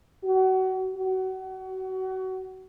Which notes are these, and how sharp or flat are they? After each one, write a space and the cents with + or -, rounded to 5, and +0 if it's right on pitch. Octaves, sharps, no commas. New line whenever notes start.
F#4 +30
F#4 +30